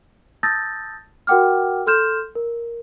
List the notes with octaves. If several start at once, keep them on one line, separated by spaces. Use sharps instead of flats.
A5 D#6 E6 G6 A6 A#6
F#4 A#4 F#5 G5 D6 F6
A4 C6 F6 G6 E7
A#4